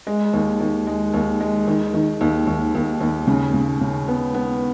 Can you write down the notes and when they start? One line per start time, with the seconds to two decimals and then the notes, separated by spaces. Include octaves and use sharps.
0.07 G#3
0.33 D#2
0.60 D#2
0.87 G#3
1.14 D#2
1.41 G#3
1.67 D#3
1.94 D#3
2.21 D#2
2.47 D#2
2.75 D#2
3.01 D#2
3.27 C#3
3.54 C#3
3.81 C#3
4.08 B3
4.34 B3